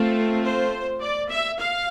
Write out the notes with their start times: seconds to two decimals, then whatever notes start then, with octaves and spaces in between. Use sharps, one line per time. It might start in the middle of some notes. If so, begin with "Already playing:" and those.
Already playing: A3 C4 F4 A4
0.43 C5
1.02 D5
1.30 E5
1.59 F5